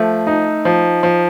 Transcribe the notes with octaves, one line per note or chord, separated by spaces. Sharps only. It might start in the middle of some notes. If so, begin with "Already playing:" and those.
Already playing: F3 A3
D#4
F3
F3